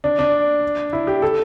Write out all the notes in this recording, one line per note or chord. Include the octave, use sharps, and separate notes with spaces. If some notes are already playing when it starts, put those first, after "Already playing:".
D4
D4
E4
G4
A4